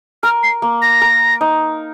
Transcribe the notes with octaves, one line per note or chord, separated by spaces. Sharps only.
A#4 F6
C7
A#3
A#6
A#4
D#4